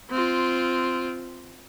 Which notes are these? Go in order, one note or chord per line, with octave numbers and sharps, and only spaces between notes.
C4 F4